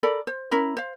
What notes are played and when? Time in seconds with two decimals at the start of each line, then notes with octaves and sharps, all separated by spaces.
0.03 A4 A#4 D5 B5
0.27 C5
0.51 C#4 E4 A#4 B5
0.77 C5 F5